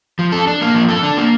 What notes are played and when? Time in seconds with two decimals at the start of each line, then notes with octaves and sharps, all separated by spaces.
0.19 F3
0.32 A4
0.47 D4
0.61 A#3
0.74 F3
0.89 A4
1.03 D4
1.17 A#3